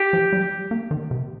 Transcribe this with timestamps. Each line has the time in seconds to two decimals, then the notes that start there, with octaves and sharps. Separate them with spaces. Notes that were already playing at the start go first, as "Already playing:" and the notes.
Already playing: G4
0.13 F3
0.33 G3
0.71 A#3
0.91 D#3
1.11 C3